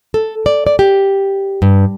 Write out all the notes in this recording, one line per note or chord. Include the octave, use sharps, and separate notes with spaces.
A4
D5
D5
G4
G2